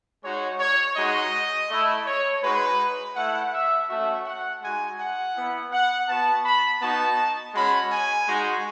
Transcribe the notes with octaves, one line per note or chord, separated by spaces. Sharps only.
G#3 D#4 F#4 C#5
C#5
G#3 D#4 F#4 D#5
A3 E4
C#5
G#3 D#4 F#4 B4
A3 E4 F#5
E5
A3 C#4 F#4 E5
F#5
G#3 D#4 F#4 G#5
F#5
B3 E4
F#5
B3 F#4 A5
B5
B3 D#4 F#4 A5
G#3 C#4 F#4 B5
G#5
G#3 D#4 F#4